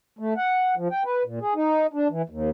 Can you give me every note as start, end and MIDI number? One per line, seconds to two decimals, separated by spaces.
0.19 0.34 57
0.37 0.75 78
0.77 0.88 53
0.91 1.03 79
1.05 1.23 71
1.25 1.39 46
1.42 1.54 68
1.55 1.87 63
1.93 2.08 62
2.10 2.22 52
2.30 2.50 39